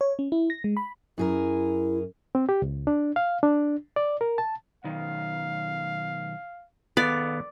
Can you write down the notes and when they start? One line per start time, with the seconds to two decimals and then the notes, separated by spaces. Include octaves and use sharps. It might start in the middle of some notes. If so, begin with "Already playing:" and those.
0.01 C#5
0.19 C#4
0.32 E4
0.50 A#6
0.64 G#3
0.77 B5
1.18 F#2 E4 G#4 A#4
2.35 C4
2.49 G4
2.62 C#2
2.87 D4
3.16 F5
3.43 D4
3.96 D5
4.21 A#4
4.38 A5
4.84 B1 D#3 F5
6.97 D#3 B3 A4 D5 F5